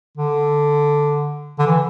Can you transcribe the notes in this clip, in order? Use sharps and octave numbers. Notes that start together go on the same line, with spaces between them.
D3
D3
E3